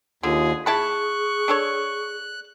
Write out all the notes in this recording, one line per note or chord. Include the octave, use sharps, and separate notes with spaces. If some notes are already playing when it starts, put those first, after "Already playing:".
D#2 D3 F4 G#4
E4 G#4 A5 B5 C#6 F#6
D4 A4 C#5